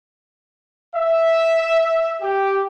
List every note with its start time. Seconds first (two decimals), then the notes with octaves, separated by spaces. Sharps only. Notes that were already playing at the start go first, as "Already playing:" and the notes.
0.96 E5
2.21 G4